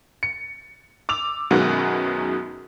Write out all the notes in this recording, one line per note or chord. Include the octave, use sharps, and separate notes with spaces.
C#7
D6 E6 F7
F#2 B2 D#3 F#3 G#3 B3